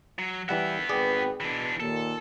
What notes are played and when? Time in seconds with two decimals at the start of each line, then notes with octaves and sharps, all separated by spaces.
0.19 F#3
0.49 E3 G3 B3 E5 F#5
0.89 G#1 G#4 B4 D5 G5
1.40 B2 E3 D4
1.80 D#2 A#2 A4